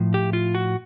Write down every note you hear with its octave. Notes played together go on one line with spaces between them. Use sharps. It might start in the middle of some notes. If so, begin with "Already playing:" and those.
Already playing: A2 F3
G4
F4
F#4